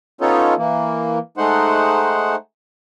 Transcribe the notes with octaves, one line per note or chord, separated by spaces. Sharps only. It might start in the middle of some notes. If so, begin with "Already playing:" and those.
B3 C#4 D#4 F4 A4 C#5
E3 A#3
G#3 A3 D#4 C5 F#5